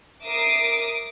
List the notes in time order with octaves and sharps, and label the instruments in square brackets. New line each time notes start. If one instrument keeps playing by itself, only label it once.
[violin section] A#4 E5 D6 D#6 C7 D7